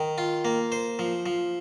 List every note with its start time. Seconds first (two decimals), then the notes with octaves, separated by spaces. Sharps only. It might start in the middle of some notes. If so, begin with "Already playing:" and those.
Already playing: D#3
0.18 F4
0.45 A#3
0.72 C5
0.99 F3
1.26 F3